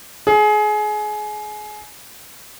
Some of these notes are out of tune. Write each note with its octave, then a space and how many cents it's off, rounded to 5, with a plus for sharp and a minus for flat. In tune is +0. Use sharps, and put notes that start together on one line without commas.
G#4 +25